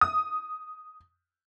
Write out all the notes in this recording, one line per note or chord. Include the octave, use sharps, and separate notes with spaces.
D#6